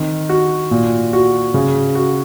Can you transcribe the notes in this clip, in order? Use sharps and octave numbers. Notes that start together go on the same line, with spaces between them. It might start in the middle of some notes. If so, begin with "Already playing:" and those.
Already playing: D#3 C4
F#4
A#2
F#4
C#3
F#4